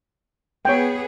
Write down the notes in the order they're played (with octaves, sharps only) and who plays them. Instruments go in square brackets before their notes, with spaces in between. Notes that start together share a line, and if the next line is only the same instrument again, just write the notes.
[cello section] B3 G#4 [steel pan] C#5 G5